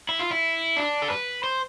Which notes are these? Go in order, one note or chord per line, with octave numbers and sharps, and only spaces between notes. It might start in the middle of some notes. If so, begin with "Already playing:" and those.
E4
F4
E4
D4
A4
B4
C5